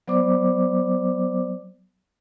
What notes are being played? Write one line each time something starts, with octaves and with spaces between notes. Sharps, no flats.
F#3 B3 C5 D5 D6